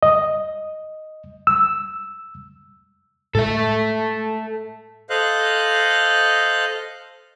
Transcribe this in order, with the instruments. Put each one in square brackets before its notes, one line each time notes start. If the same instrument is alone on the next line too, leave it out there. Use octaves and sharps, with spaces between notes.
[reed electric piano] D#5
E6
[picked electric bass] A2 G#3 [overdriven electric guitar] A4 E5
[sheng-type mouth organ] A4 C5 D#5 F5 F#6